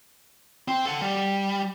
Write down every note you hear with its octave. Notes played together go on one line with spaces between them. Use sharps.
C4
A4 F#5
G3